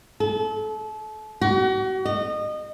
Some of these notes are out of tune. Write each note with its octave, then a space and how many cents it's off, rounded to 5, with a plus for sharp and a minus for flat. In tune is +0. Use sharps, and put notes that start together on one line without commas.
A4 -30
F#4 +40
D#5 -25